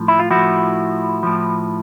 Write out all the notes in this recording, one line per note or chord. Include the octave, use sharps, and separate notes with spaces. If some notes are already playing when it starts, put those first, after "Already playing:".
Already playing: A2 F3
E4
F4
A2 F3 E4 F#4
A2 F3